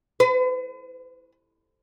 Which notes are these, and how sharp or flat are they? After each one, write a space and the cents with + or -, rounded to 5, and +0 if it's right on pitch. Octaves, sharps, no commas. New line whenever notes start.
B4 +45